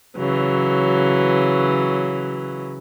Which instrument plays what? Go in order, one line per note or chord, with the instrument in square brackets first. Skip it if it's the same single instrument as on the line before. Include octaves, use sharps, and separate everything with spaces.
[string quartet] C#3 E3 F#3